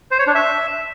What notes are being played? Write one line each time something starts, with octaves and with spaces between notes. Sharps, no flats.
C5
C#5
D4
E5